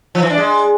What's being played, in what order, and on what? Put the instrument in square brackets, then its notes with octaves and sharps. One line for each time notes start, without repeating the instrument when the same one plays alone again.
[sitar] F3
E3
D4
G#3